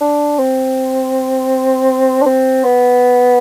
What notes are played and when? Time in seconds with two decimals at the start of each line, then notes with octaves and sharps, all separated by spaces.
0.01 D4
0.39 C4
2.22 D4
2.26 C4
2.64 B3